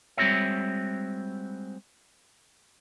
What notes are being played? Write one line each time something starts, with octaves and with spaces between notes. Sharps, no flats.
G3 G#3 C4 F#4 C#5 E5